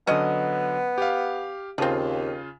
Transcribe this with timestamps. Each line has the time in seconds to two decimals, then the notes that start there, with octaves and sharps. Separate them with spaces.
0.07 D3 F#3 B3 C#4 D#5
0.98 G4 F5
1.78 D#2 C#3 F3 C4 F4